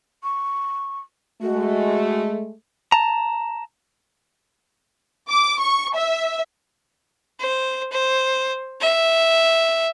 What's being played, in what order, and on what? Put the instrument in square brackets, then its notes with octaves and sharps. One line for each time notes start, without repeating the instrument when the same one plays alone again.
[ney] C#6
[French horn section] G#3 A3 [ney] F#4
[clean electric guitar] A5 A#5
[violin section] D6
C#6
E5
[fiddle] C5
C5
E5